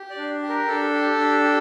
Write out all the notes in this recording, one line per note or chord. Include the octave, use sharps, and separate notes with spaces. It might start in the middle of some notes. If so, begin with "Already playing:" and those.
Already playing: G4
D5
D4
G4
A#4
D4 A4
G4
D4
G4